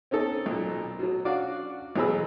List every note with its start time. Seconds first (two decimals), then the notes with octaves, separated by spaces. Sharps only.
0.11 C4 C#4 D#4 A4
0.46 B1 A#2
0.99 B2 F#3
1.25 C#4 D4 F#4 D5 F5
1.96 B1 E2 F#3 G#4 B4 E6